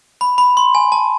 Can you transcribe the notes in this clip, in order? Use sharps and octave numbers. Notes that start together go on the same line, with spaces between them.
B5
B5
C6
G#5
A5